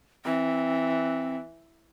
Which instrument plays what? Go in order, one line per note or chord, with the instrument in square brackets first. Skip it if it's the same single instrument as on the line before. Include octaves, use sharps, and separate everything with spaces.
[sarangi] E3 [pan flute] C4